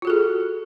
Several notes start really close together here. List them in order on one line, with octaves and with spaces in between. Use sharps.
F4 F#4 A4 G#4